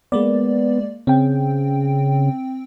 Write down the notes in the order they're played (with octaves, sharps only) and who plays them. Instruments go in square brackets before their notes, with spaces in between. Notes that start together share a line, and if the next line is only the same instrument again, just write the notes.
[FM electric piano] G#3 A#3 D5 [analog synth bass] B3
[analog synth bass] C#3 [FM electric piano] C4 G5